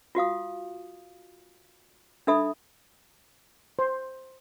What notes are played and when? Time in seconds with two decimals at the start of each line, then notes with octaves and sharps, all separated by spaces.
0.15 F4 F#4 F5 D#6
2.27 D4 D#4 A4 E5 B5 D#6
3.79 C5